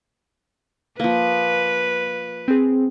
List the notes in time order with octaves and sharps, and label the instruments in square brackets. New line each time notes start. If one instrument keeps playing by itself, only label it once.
[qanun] F3 A#3 [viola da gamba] B4
[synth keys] C4 G#4